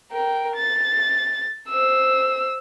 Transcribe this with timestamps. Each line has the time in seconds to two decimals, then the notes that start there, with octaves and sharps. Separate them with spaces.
0.12 A#4 G5
0.56 A6
1.69 C5 E6